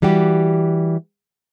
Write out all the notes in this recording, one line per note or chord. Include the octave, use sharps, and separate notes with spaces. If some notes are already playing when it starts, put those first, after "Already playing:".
E3 G3 F#4 G4